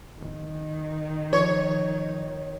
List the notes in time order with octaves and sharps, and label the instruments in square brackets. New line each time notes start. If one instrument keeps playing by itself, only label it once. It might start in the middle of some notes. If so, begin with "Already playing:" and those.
[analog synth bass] D1 [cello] D#3
[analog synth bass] F3 [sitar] C#5